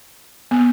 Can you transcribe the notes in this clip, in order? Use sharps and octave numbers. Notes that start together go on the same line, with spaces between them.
B3